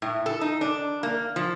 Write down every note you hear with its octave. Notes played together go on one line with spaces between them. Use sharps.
A2
A4
D#4
D4
A#3
F3